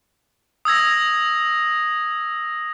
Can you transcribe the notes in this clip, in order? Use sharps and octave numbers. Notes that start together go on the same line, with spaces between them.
D#6 E6 G#6 A#6